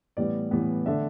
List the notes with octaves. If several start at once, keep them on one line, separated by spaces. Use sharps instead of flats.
A2 E3 G3 B3 D5
A2 E3 G3 B3
D3 A3 D4 E5